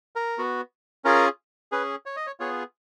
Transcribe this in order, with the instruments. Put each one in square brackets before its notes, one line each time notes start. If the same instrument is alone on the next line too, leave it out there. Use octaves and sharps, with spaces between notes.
[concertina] A#4
B3 F#4
C#4 F4 G#4 A#4
C#4 G#4 B4
C#5
D#5
C#5
B3 F4 G#4 C#5